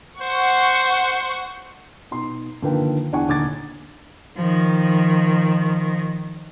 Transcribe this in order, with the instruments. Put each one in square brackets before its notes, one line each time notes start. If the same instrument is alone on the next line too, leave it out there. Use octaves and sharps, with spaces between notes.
[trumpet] C5 [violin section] F#5 C#6
[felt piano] B2 D#4 C6
D3 D#3 F3 A#3 B4 G5
E2 D4 F#5 G#5 C#6
D#1 D3 D#4 D6 G#6 A6
[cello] D#3 F3